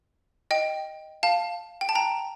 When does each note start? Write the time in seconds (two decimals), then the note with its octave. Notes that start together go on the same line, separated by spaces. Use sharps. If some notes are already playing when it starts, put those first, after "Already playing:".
0.51 D#5 G5
1.23 F5 A5
1.81 G5
1.89 A5
1.95 G5 A#5